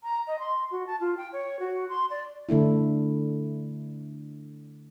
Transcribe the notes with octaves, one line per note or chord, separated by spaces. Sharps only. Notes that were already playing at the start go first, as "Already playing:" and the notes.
A#5
D#5
C6
F#4
A5
F4
G5
C#5
F#4
C6
D5
D3 A3 D4 E4